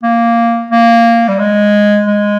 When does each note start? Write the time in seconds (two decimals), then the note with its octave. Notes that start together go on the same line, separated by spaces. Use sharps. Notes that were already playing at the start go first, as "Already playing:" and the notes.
0.03 A#3
0.71 A#3
1.28 G3
1.39 G#3
2.06 G#3